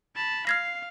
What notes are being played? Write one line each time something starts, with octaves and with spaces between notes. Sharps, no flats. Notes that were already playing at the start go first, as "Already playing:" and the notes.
A5 B5
F5 F6 G#6 A#6 C7